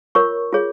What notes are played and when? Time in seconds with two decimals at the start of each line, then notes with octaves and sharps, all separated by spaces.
0.15 F4 A#4 C#5 C#6
0.53 F4 G#4 C#5